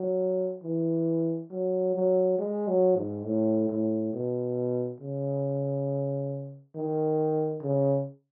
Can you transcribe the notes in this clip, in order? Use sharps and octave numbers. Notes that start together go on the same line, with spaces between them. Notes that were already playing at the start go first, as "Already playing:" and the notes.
Already playing: F#3
E3
F#3
F#3
G#3
F#3
G#2
A2
A2
B2
C#3
D#3
C#3